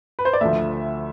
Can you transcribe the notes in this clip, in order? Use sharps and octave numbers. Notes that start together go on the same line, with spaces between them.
B4
C5
D5
D2 D3 F3 E5